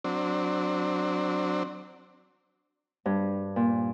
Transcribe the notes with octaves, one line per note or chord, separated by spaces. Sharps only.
F#3 C4 D4
G2
A#2